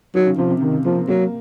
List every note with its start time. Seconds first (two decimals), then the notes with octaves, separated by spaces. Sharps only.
0.15 D#3 F#3
0.26 C#3
0.38 C3 F3
0.50 C3
0.61 C3 D#3
0.85 F3 A#3
0.97 C4
1.08 F#3 A#3